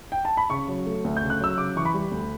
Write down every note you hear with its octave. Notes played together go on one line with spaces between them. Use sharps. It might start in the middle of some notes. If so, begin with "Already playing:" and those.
G5
A5
B5
C#3 C#6
F#3
A3
D2
G6
C#3
F#6
F#3 E6
C#3 D6
E3 C#6
B5
G3
D2